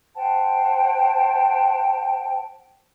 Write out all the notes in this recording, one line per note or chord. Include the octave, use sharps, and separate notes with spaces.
C5 F#5 G5 A5